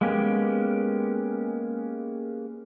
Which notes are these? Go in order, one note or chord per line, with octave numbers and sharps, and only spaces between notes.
G#3 A#3 B3 C#4 G4